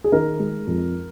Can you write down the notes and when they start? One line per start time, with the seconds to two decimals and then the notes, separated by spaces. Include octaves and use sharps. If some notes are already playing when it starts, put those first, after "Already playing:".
0.04 G#4
0.12 D#3 A#4
0.40 G#3
0.67 F2